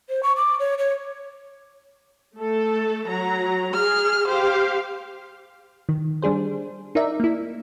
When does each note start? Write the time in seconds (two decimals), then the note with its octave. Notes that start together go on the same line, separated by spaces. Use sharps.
0.09 C5
0.23 C#6
0.37 D6
0.60 C#5
0.78 C#5
2.36 A3 A4
3.08 F#3 A#5
3.74 G#4 F6
4.28 G4 C5 F5
5.89 D#3
6.22 G3 D4 G#4 C5
6.95 D#4 A#4 D5 E5
7.20 A#3 E4